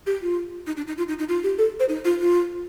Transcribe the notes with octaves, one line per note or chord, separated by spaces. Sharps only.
G4
F4
D#4
D4
D#4
F4
D#4
D#4
F4
G4
A4
C5
D#4
F4
F4